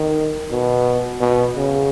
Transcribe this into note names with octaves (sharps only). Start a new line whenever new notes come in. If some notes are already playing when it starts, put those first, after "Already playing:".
Already playing: D#3
B2
B2
C#3